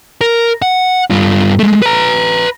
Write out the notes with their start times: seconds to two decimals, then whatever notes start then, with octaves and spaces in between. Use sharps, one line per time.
0.21 A#4
0.62 F#5
1.10 G2 F4
1.59 G#3 A3
1.82 B4 A#5